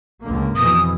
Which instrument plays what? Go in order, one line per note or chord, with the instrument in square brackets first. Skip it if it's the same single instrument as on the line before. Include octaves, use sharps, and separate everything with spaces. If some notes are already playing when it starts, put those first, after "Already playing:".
[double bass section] C#2 D3 A#3
[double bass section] F2 B2 E3 [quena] D#6